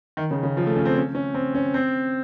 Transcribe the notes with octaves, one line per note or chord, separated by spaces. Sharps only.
D#3
C#3
C#3
F3
A3
C#4
C4
C#4
C#4
C4
C#4
C4